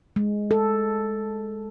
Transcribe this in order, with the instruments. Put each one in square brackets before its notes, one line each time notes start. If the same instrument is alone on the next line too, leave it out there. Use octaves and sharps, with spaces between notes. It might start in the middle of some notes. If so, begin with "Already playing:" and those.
[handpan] G#3
A4